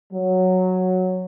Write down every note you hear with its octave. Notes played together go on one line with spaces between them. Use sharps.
F#3